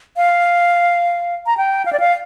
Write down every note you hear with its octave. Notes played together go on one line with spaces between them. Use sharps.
F5
A#5
G5
F5
D5
F5